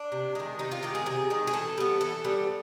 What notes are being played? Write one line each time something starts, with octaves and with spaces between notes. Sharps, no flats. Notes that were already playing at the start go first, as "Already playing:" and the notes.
Already playing: D4
C3
D#3 G#3
C3 D#4
F4
D#3 G#3 G4
G#4
C3 G#4
D#3 G#3
G#4
E3 A4
G3 B3
E3 A4
G3 B3